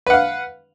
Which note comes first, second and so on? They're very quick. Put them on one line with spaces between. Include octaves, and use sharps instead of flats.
B4 F#5 F5